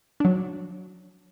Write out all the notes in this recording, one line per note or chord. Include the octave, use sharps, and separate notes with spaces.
F#3 D4